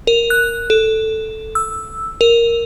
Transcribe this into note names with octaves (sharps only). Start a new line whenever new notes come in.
A#4
F#6
A4
E6
A#4